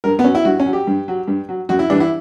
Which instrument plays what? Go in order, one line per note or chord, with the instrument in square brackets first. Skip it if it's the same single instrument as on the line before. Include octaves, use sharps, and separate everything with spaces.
[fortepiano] G2 A#4
B3
F#3 C#4
E4
G2 F#4
C#4
F#3
G4
G2
F#3
G2
F#3
F#2 F#4
E4
E3 G3 D4
E4